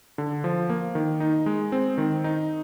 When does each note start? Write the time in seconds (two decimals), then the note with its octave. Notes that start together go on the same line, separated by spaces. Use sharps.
0.18 D3
0.44 F3
0.70 A#3
0.95 D#3
1.20 D#4
1.46 G#3
1.72 C4
1.98 D#3
2.24 D#4